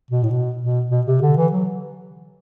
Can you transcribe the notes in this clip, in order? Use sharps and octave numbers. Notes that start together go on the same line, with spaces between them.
B2
A2
B2
B2
B2
C3
D3
E3
F#3